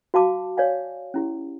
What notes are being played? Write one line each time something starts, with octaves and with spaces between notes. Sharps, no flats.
F#4 F5 A5 D6
C#5 D5 F5 G#5
C#4 E4 G4